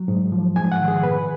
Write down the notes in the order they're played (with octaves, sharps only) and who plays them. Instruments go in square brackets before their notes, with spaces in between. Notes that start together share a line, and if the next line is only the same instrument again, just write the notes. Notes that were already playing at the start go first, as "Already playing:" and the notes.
Already playing: [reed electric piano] F#3
G#2
F3
G#2 G#5
F#5
D#3
G#4
B2 B4